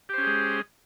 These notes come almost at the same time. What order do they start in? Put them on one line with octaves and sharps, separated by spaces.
G4 C5 C#4 G#4 G#3